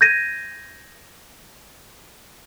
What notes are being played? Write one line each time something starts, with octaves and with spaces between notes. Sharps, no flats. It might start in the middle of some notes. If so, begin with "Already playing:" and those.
G6 G#6 A#6 D#7